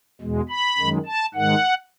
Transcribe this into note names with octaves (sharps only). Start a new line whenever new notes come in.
E2 B2 G#3
B5
F#2 D#3 G#3
A5
G#2 D#3 G#3 F#5